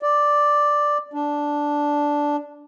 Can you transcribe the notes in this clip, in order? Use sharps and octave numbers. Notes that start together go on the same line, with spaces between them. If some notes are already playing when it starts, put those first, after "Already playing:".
D5
D4